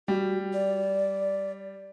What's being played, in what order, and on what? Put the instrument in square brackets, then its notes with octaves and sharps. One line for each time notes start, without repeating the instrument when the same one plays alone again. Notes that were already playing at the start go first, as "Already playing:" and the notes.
[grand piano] G3 [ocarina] F#4
[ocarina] D5